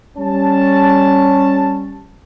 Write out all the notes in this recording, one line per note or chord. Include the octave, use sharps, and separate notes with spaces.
G3 C#4 A5